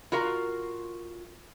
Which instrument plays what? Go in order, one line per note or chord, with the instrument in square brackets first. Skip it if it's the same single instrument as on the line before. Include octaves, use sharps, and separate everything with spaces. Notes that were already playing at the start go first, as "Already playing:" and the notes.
[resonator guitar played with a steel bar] F4 F#4 A#4 F5